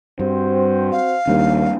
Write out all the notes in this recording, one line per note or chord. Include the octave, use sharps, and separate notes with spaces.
G2 C4 F#4 C5
F5
D#2 G3 A#3 D4